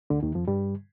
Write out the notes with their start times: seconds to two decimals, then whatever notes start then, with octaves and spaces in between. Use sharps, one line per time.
0.10 D2 D3
0.23 D#2 D#3
0.35 F2 F3
0.48 G2 G3